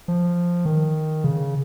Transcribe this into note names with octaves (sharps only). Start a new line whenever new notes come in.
F3
D#3
C#3